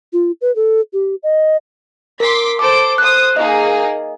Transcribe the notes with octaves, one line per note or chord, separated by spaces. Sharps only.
F4
B4
A4
G4
D#5
A#4 C6 D6 B6
A4 C5 D6 D7
C5 D#6 F#6
A#3 D#4 G#4 D#5